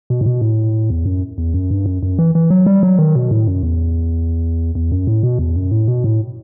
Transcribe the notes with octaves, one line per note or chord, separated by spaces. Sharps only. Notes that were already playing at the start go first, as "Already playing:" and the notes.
B2
A2
B2
A2
E2
F#2
E2
F#2
G2
F#2
F#2
E3
E3
F#3
G3
F#3
D#3
B2
A2
F#2
E2
E2
F#2
A2
B2
E2
F#2
A2
B2
A2